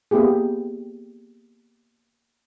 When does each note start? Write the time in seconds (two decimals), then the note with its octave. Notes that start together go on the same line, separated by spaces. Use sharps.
0.11 A#3 B3 E4 G4 G#4